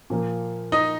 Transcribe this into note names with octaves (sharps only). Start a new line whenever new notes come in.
A#2 F3 A#3
D#4 D#5